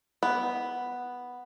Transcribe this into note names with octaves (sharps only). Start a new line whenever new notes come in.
B3